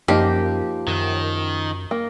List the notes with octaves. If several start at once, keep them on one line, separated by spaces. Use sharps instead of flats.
F#2 F3 A#3 D#4 G4
F#2 D#3
A#3